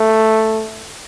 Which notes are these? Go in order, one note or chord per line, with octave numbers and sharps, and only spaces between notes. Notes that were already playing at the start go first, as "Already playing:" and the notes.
Already playing: A3